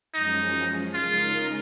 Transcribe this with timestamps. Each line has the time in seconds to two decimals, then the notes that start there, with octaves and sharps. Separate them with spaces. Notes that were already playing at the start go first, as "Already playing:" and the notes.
0.14 F#2 F3 G#3 C#4 D#4
0.94 C#3 G#3 D#4 F4 A#4